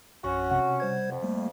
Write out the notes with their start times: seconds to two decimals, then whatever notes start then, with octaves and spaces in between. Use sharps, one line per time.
0.24 A#1 F#2 C#4 F#4 C#6
0.51 C3 F#5
0.80 G3 C5 G#6
1.11 F2
1.23 G3 A3 A#3